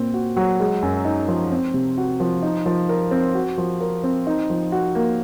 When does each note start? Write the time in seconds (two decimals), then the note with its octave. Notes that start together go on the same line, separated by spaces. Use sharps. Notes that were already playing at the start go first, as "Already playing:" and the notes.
Already playing: A#2 C4
0.14 F#4
0.37 F#3
0.60 G#3
0.82 F#2
1.05 D#4
1.28 F3
1.52 C4
1.74 C3
1.98 F#4
2.20 F3
2.43 D#4
2.66 F3
2.89 A#4
3.11 C4
3.35 F#4
3.58 F3
3.80 A#4
4.04 C4
4.27 D#4
4.50 F3
4.72 F#4
4.95 A#3